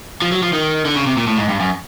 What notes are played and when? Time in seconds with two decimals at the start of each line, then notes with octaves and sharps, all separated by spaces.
0.22 F3
0.32 F#3
0.43 F3
0.53 D#3
0.85 D3
0.96 C#3
1.07 C3
1.17 A#2
1.27 A2
1.38 G#2
1.49 G2
1.60 F#2